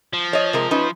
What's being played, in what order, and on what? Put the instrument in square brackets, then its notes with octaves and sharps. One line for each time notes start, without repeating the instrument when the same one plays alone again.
[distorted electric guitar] F3
[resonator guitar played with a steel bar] C#5 D#5
C3 G#3 A#4
C#4 D#4 B4